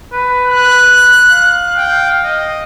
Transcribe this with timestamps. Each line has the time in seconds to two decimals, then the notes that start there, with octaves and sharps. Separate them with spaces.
0.13 B4
0.45 F#6
1.31 F5
1.77 G5
2.24 D#5